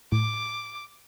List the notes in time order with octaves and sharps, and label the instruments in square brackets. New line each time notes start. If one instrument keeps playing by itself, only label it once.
[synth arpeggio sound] A2 [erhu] D6